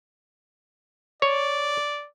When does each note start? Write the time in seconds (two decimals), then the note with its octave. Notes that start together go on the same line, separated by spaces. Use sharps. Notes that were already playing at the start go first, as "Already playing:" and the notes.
1.22 C#5 D5